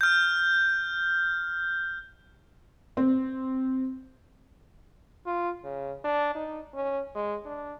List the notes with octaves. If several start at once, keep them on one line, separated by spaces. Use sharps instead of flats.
F6 G6
C4
F4
C#3
D4
D#4
C#4
G#3
D4